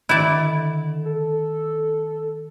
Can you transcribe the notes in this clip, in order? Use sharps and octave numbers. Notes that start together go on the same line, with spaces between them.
D3 D#3 E4 D5
A4